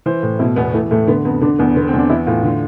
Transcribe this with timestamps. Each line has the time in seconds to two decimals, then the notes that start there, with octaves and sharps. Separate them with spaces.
0.06 E3 C5
0.23 A2
0.39 B2 E4
0.56 E2 B3
0.74 E3 A3
0.91 A2 A3
1.07 D3 B3
1.25 F2 B3
1.41 D3 D4
1.59 E2 B3
1.76 D3 B3
1.87 C4
1.94 E2
1.99 D4
2.10 E3 E4
2.27 A2 F4
2.44 D3